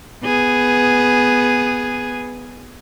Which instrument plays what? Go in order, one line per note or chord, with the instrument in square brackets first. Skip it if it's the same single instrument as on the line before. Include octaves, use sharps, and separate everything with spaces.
[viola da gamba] B3 G#4